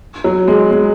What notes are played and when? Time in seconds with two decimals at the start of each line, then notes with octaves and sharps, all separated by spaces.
0.24 F#3
0.48 G#3
0.71 G#3